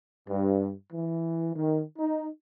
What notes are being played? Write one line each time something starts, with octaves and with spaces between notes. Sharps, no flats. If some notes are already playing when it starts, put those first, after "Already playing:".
G2
E3
D#3
D#4